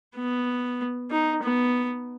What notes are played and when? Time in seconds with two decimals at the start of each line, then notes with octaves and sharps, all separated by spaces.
0.16 B3
1.11 D#4
1.43 B3